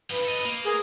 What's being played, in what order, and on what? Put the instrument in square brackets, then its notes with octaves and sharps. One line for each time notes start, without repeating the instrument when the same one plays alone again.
[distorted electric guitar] G2 F3 [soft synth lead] B4
[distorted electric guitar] A4 D#5
A#3
[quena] G#4 [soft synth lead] A#4